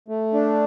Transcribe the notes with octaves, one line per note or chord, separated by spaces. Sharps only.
A3
D4